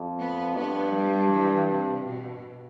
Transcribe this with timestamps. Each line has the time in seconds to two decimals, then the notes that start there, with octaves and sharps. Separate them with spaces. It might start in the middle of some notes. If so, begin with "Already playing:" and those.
Already playing: F2
0.19 B3
0.55 G2 B3
0.94 G3
1.30 E3
1.68 C3
2.04 B2